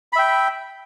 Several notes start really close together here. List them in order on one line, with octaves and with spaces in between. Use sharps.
B5 E5 G5